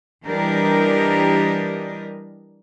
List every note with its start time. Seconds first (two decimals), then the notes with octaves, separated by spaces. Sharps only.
0.25 E3 G3 D4 G4 A#4 D#5